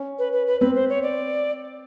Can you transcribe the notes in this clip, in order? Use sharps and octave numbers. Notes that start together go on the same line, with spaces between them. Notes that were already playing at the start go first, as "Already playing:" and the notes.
Already playing: C#4
B4
B4
B4
C4 B4
C5
C#5
D5